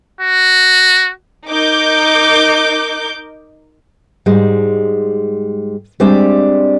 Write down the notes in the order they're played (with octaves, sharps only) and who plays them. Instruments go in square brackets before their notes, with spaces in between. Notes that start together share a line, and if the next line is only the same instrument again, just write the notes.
[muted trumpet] F#4
[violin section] D#4 A#4 D6 G6
[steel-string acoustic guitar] G#2 G3 G#3
G3 G#3 C4 D4 D5 E5